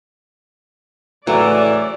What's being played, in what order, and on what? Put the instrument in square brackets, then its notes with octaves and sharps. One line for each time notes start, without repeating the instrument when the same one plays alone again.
[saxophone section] D2 C#3 E3 [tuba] A2 [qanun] F#3 [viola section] D5